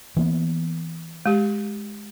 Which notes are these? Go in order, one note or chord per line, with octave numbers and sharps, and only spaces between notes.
E3 A#3 B3
G#3 G4